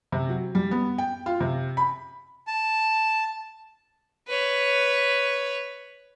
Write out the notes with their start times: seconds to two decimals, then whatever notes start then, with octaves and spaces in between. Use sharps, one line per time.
0.12 C3
0.29 F#3
0.55 G3
0.71 B3
0.98 G5
1.26 F4
1.40 C3
1.77 B5
2.47 A5
4.28 B4 C#5